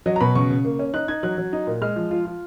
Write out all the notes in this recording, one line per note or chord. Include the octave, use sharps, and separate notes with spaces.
F#3 D#5
A#5
B2 B5
C#3 C#6
C#3
A#3
C#4
D#4 F#6
D#4 G#6
F#3 F#6
F#3
D#4
A#2
G#3 F6
F3
F4
F4